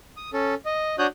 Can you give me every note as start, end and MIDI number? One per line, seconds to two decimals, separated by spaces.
0.17 0.30 87
0.33 0.55 61
0.33 0.55 69
0.66 0.96 75
0.99 1.07 62
0.99 1.07 66
0.99 1.07 73
0.99 1.07 87
0.99 1.07 90
0.99 1.07 91